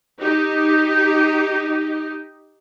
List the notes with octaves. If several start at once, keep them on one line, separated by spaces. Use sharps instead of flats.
D#4 G4